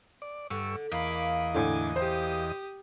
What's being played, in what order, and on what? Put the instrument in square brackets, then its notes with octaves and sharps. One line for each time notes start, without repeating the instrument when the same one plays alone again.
[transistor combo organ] D5
[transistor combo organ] G2 C#6 E6 [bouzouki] D3
[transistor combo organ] E2 D#5 [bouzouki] A#3 [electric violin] B5
[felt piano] A2 D3 [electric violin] G#5 D6
[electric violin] G4 D#6 [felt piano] C5